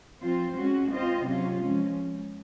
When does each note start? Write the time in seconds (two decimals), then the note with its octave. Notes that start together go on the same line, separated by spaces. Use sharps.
0.23 F3 C4 F4 C5
0.58 G#3 C#4 F#4
0.92 C4 F4 C5 D#5
1.26 C3 F#3 C#4 F4
1.62 F3 G#3 C#4